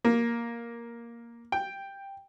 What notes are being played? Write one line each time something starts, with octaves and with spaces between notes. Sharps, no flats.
A#3
G5